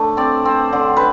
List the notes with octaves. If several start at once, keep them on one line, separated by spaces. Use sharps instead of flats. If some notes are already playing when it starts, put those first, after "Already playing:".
Already playing: A3 D4
C4 D5
C4
D3
B4